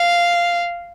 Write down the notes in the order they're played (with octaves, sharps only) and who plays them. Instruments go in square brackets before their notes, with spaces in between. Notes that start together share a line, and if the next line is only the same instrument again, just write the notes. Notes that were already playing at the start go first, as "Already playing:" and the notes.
Already playing: [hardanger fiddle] F5